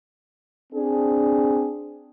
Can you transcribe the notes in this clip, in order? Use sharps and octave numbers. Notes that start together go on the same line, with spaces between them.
C4 D4 G#4